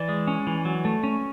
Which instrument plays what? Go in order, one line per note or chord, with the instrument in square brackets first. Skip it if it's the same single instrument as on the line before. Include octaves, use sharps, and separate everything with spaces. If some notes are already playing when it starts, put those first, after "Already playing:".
Already playing: [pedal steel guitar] E3 D5
G#3
C#4
E3
F#3
A3
C#4